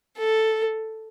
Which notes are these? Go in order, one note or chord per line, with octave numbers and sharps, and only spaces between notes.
A4